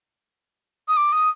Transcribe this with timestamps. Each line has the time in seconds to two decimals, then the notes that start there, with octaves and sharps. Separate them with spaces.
0.88 D#6
0.97 D6
1.13 D#6